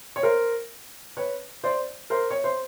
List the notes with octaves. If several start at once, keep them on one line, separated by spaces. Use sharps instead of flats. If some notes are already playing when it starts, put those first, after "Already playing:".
C#5
A#4 C5
B4 C#5
C5 D5
A#4 C5
C#5
C5